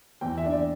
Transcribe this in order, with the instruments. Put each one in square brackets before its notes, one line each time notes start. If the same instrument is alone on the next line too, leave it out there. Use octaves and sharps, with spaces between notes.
[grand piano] E2 [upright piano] G5
[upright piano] E5
[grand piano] D4
[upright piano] D5